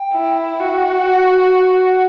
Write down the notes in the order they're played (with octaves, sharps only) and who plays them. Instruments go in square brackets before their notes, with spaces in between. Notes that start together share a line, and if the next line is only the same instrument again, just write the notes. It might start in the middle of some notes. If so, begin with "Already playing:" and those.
Already playing: [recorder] G5
[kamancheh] E4
F#4
[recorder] G5
F#5